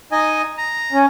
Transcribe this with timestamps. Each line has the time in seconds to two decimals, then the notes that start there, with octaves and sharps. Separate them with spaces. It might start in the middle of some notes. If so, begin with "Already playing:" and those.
0.12 D#4 D#5 G#5
0.57 A#5
0.92 C#4